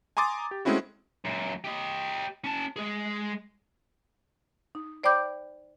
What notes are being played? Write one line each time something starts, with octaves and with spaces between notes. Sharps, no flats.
G#5 A#5 C6 D6 D#6 A6
G4
G#3 A3 C4 C#4 E4 F#4
F#2 A#2
G4 D#5
C#4 A5
G#3 G#4
D#4
C5 D5 G5 B5 D6 G6